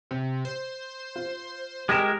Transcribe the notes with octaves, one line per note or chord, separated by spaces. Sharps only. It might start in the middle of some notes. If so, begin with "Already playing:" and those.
C3
C5
F4
G#3 G4 A#4 G#6 A#6 E7